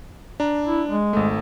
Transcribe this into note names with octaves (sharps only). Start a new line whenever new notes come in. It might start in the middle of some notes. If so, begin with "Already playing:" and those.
D4 A#5
E4
G#3
G#1 A3